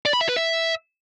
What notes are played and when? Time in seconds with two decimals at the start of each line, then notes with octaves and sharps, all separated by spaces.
0.06 D5
0.13 B5
0.21 E5
0.29 B4
0.36 E5